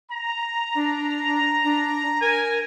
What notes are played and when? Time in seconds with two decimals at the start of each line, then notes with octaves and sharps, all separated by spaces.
0.12 A#5
0.75 D4
1.64 D4
2.21 A#4 G#5